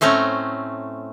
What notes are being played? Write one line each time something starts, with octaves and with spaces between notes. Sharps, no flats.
A2 A3 C4 C#4 A#5